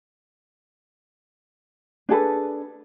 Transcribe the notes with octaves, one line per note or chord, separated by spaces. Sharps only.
D4 G#4 A4 B4